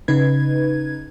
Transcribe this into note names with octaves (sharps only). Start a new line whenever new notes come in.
C#3 D#4 B4 G#6